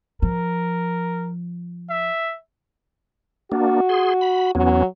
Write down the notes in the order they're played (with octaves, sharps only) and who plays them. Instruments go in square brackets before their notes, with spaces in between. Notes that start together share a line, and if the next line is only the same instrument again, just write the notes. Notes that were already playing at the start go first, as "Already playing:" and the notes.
[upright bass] F3 [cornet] A#4
[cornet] E5
[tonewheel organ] A#3 D4 [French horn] F#4
[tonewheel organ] G#4 C6
B5
[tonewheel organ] E2 B3 C#4 [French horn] F#3